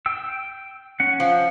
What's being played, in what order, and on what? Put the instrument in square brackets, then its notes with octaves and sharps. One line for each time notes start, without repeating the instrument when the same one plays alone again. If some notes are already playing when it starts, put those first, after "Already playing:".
[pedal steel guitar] G5 E6
C#4 F#5
[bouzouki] F3